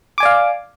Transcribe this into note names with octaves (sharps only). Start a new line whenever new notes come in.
D5 F5 G#5 D6